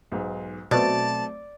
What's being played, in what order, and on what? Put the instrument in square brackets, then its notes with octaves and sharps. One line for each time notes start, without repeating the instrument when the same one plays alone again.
[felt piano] B1 G#2
[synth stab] B2 [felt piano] F#3 A3 C4 [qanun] D5 [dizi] A5